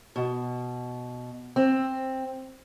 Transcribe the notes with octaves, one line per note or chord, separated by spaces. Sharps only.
B2
C4